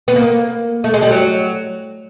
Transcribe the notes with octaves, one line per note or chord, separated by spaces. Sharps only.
B3
A#3
A3
G#3
G3
F#3